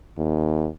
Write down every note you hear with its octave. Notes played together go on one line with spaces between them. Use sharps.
D#2